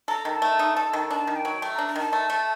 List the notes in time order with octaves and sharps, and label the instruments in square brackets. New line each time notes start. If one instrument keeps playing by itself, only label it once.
[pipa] A4 [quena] A#5
[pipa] D#3
[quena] A5
[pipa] A3
D#4
A4
D#3
[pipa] D4 [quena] A5
[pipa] D#3
[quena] G5
[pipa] F#3
A3
[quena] A#5
[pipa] D4
[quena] A#5
[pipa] D#3 [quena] A5
[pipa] A3
A3